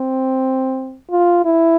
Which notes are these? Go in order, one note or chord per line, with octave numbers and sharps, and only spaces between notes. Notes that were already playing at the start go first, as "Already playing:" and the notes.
Already playing: C4
F4
E4